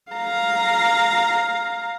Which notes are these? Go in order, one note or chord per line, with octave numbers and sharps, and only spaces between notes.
F5 A#5